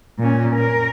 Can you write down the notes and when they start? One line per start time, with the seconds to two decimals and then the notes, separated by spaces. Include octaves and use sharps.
0.19 A#2 C#4
0.55 A#4